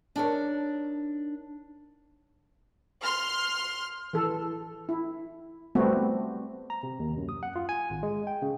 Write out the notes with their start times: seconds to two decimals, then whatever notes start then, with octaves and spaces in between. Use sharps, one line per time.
0.16 D4 D#4 A#4 C#5
3.03 C6 F6
4.13 E3 A4
4.89 E4
5.75 G3 A3 B3 C4 F#4
6.70 A#5
6.83 C3
6.99 D#2
7.17 F#2
7.29 D#6
7.43 F#5
7.56 F4
7.69 G#5
7.90 G#1
8.03 G#3
8.27 G5
8.42 C#3